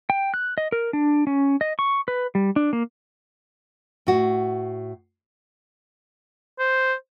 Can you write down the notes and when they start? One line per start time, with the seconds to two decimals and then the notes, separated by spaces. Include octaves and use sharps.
0.10 G5
0.34 F#6
0.58 D#5
0.72 A#4
0.93 D4
1.27 C#4
1.61 D#5
1.79 C#6
2.08 B4
2.35 G3
2.56 D4
2.73 A#3
4.07 A2 F#4
6.59 C5